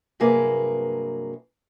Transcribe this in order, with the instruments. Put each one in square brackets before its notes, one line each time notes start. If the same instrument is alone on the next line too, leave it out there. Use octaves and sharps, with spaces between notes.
[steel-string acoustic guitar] G2 C3 F#3 A#3 G#4 B4